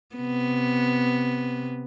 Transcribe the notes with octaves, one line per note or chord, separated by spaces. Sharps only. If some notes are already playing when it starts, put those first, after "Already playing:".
C3 B3